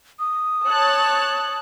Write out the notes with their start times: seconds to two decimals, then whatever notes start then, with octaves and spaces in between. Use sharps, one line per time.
0.19 D#6
0.66 C#5 A5 F#6